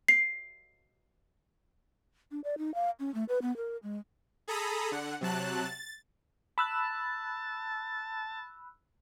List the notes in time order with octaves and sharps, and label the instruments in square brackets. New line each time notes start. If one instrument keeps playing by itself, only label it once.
[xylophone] C7
[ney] D4
D5
D#4
F5
C#4
A3
B4
B3
A#4
G#3
[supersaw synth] G#4 A4 A#5 B5 D#6
D3 F#5
C3 F#3 A5 F#6
A6
[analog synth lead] A5 [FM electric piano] B5 E6 F#6